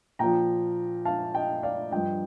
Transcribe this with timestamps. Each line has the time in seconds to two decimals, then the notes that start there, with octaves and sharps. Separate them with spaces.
0.19 A#2 F3 G5 A#5
1.05 F5 A5
1.35 D#5 G5
1.63 D5 F5
1.91 G2 F3 D#5 G5